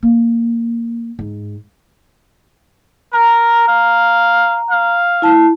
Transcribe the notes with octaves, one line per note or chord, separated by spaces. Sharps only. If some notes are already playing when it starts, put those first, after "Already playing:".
A#3
G#2
A#4 A#5
F5
F5
E4 A5